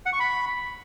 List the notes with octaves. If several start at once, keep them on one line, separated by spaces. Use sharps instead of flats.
F#5
C#6
B5